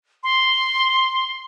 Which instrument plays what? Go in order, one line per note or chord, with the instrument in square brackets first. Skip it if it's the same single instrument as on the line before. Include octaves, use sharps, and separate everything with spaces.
[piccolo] C6